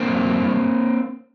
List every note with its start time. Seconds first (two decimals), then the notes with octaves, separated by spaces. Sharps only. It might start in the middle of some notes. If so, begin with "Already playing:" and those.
Already playing: A#3 C4
0.08 F#2
0.25 F#2
0.43 G2